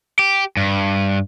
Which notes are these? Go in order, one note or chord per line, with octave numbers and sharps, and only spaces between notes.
G4
G2